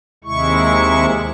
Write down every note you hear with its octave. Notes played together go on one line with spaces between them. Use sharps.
D#2 C3 G#3 E4 C#6